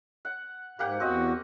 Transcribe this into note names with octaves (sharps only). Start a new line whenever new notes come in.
F#5
G#2 A#3 G4 F#5
E2 C4 F#4 D#5